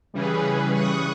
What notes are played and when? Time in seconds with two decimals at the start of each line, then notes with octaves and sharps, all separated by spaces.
0.14 C#3 E3 G3 C#4 G#4 B4
0.71 C#6 D#6 F#6